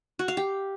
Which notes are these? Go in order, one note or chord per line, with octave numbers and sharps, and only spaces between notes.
F#4
F5
G4